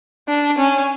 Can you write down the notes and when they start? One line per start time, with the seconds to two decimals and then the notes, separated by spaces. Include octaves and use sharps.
0.28 D4
0.59 C#4